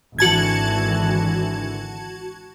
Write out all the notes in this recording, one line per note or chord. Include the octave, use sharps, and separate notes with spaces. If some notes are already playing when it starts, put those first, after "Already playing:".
G#1 D3 E3 F#4 A5 G#6